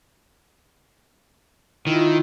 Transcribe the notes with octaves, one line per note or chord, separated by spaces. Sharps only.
D#3 E4 F4